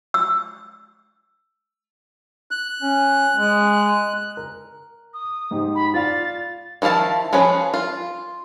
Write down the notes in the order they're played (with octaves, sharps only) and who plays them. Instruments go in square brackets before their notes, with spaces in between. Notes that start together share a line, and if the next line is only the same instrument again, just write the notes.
[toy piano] E6
[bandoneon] F#6
[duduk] C#4
G#3
[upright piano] A#4
[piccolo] D#6
[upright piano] G#2 D#4 G4
[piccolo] B5
[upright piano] F4 D5 F5 [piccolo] A6
[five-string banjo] D#3 F3 E4 F5 A5
F3 C#4 F4 G#4 B4
F4